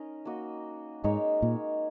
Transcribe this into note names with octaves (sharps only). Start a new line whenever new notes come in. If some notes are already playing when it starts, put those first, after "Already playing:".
Already playing: C#4 D#4 A#4 D#5
A#3 F#4 D#5
G#2 G#3 D#4 A#4 C#5
A#2